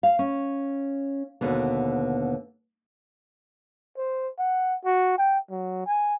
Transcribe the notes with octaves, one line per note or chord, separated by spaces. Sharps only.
F5
C#4
D#2 B2 D3 B3
C5
F#5
F#4
G5
F#3
G#5